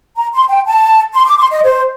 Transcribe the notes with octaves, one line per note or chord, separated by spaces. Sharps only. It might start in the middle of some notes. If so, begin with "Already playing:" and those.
A#5
C6
G5
A5
C6
D6
C6
D#5
C5